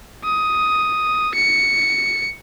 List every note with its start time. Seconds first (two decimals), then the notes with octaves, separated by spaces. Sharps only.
0.24 D#6
1.34 C#7